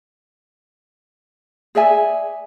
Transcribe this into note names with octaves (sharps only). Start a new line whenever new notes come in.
G#4 D5 E5 G#5